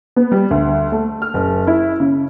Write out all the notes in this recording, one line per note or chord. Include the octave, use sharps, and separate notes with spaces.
B3
G3
D2
A3
F6
F#1
E4
C#3